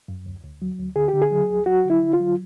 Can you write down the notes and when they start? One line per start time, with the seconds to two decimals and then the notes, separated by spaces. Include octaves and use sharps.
0.08 F#2
0.26 D2
0.44 D2
0.62 F#3
0.79 D2
0.96 D3 G#4
1.08 G4
1.13 D3
1.22 G#4
1.31 F#3
1.50 D2
1.66 F#3 F#4
1.85 D3
1.90 E4
2.02 D3
2.13 F4
2.20 F#3